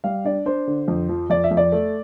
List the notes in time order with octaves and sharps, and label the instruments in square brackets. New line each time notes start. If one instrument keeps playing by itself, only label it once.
[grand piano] G3 F5
D4 D5
D4 C5
D3
F2
F3
F2 D5
E5
F2
D5
A3